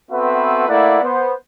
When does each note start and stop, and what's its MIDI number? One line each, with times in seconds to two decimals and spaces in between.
0.10 0.67 59
0.10 0.67 60
0.10 0.67 66
0.10 0.67 69
0.10 0.67 71
0.10 0.67 76
0.68 1.01 57
0.68 1.01 58
0.68 1.01 64
0.68 1.01 74
0.68 1.01 76
0.68 1.01 78
1.03 1.32 59
1.03 1.32 72